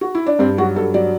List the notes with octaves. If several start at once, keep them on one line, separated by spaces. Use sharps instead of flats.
F#4
E4
D4
G2 C4
F#3 F#4
G2 A4
F#3 D5